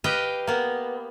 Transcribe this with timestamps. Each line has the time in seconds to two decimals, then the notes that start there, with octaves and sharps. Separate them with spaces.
0.04 G4 B4 D#5 F5 G5
0.47 A#3 B3